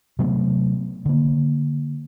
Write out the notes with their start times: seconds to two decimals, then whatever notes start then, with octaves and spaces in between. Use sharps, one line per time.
0.19 C3 F#3 A3 B3
1.06 D3 A#3